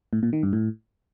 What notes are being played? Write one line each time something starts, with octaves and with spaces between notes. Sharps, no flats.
A2
A#2
D#3
G2
A2